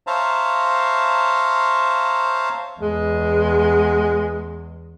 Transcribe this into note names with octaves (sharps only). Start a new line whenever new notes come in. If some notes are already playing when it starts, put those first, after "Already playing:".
C5 C#5 E5 F5 A5 A#5
E2 G#3